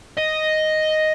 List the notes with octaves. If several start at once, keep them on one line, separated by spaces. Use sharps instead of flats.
D#5